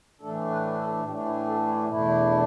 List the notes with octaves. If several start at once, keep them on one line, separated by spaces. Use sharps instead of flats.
A2 E3 A3 D4 A4
B4
B4
A4
A2 E3 A3 D4 G4
E4
A4
E4
E2 B2 A3 D4 E4